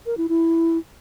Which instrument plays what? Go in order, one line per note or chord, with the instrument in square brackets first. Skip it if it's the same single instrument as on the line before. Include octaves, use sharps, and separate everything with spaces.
[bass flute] A#4
E4
E4